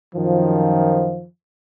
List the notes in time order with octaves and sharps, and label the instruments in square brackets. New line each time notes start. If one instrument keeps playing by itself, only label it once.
[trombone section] F#2 D#3 F3